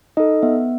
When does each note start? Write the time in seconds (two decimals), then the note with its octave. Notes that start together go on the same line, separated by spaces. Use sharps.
0.17 D#4 A4 D#5
0.42 B3 E5